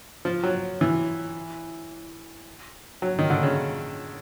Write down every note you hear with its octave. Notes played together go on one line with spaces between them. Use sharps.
F3
F#3
E3
F#3
D#3
D3
C#3